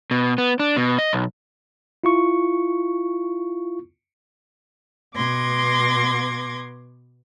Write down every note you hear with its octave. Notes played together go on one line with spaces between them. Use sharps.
B2
B3
D4
B2
D#5
B1
E4 F4 C#6
B2 B3 C6 D6 G#6 A#6